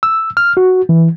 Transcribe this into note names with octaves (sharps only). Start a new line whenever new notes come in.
E6
F6
F#4
E3